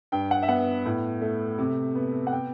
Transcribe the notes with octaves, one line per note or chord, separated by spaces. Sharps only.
G2 G5
F#5
E5
B3 F#5
A2
A3
C3
B3
F#5
G5